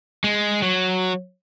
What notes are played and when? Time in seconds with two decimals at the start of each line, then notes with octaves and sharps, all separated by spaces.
0.24 G#3
0.62 F#3